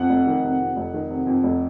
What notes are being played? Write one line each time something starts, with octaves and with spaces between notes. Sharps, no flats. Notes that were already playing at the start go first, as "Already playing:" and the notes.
Already playing: F2 F#5
F1
D#3
C3
F2
F1
D#3
C3
F2
F1